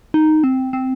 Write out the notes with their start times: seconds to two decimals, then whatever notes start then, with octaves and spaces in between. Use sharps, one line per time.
0.14 D#4
0.44 C4
0.73 C4